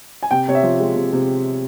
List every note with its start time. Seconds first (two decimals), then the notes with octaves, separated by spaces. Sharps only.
0.23 G#5
0.31 C3 G5
0.48 C3 C#5
0.55 E5
0.63 F3
0.80 G#3
0.96 C3
1.13 C3